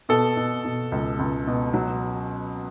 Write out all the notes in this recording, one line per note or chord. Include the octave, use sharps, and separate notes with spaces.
B2 A4
B2
B2
C#2
C#2
B2
F#3